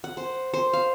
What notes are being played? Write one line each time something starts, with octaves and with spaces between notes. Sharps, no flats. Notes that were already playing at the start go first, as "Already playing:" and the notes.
F#5
C5
C5
F5